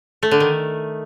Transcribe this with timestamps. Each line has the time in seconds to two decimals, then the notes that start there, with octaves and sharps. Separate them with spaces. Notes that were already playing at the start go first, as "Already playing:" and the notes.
0.23 A3
0.31 D3
0.40 D#3